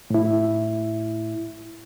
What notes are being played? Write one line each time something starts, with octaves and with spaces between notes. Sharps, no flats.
A2 E4